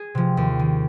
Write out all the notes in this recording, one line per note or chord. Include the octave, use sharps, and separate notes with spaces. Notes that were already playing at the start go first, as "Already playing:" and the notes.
Already playing: G#4
C3 F3
D#2
D#3